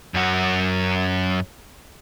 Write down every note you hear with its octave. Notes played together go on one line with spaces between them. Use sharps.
F#2 F#4